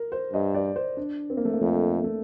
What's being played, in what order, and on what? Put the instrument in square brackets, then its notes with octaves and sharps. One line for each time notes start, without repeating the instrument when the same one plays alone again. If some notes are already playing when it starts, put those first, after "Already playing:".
Already playing: [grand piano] A#4
C5
[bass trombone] G2 [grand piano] D#5
[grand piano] D5
C5
D4
C4
A#3
A3
A#3
[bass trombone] F2 [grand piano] A3
[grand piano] A3